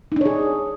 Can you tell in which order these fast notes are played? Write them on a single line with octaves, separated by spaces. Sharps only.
D#4 D4 C#5 G#4